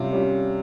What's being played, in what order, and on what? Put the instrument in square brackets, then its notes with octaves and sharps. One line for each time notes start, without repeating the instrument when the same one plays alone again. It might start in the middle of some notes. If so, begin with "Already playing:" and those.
Already playing: [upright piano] C3 [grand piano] G3 C#4 F4
[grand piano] G3 C#4 F4